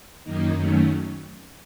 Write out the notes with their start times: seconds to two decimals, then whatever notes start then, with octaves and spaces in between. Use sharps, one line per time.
0.24 F#2 D#3 A#3 D#4
0.54 F#2 D#3 F#3 A3 C#4